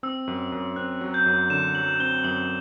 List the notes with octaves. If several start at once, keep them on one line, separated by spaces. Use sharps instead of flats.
C4 E6
F#2
F#2
C4 F#6
F#3
G6
F#2
D3 E7
F#3 F#7
C4 G7
F#2 F#7